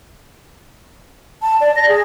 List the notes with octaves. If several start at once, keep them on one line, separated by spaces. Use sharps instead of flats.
A5
D5
A#6
G#4